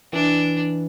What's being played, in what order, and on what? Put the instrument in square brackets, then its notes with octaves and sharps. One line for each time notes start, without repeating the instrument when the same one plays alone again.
[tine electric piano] E3 [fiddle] D4